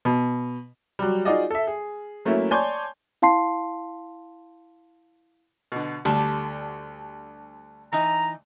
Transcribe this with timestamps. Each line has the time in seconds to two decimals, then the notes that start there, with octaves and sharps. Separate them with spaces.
0.05 B2
0.99 F#3 G3
1.25 D#4 F4 F#4 G#4 D5 D#5
1.51 A4 E5
1.67 G#4
2.25 F#3 A3 A#3 C#4 E4
2.51 C#5 D5 G#5 A5 C6 G6
3.22 E4 F5 A5 C6 C7
5.72 B2 D3
6.05 D2 D3 G3 G4 A5
7.93 E3 D#4 A#5